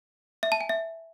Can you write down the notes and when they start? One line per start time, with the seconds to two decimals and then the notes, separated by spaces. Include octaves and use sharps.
0.43 E5
0.52 A5
0.61 G#5
0.69 E5